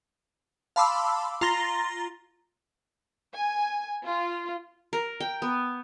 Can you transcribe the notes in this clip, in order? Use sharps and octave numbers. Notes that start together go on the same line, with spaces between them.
F5 A5 B5 C6 D6 E6
F4 A#5 C6 A6 A#6 G7
G#5
F4
A#4
G5
B3